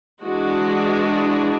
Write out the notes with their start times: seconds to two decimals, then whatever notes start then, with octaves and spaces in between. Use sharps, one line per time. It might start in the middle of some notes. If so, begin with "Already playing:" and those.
0.22 E3 G#3 D4 F#4